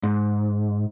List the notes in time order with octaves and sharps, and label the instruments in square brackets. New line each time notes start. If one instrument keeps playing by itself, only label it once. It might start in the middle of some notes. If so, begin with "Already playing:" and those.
[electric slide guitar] G#2